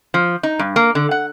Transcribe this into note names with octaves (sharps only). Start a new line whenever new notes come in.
F3
D#4
G2
A#3
D3
F#5